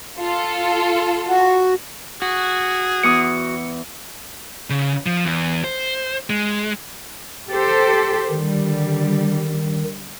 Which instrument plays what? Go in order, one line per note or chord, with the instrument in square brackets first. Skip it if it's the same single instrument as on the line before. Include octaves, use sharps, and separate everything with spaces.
[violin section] F4 A4
[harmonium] F#4
[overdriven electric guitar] F#4 [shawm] G#4
[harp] E2 D6 D#6 [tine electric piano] C#7
[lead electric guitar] C#3
F3
E2
C5
G#3
[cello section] G4 A4 C5
[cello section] D3 G3 [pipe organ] D#3